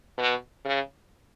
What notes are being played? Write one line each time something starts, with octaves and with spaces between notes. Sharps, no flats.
B2
C#3